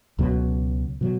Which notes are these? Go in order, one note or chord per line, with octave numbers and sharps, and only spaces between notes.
C#2 B2 F#3
B2 F#3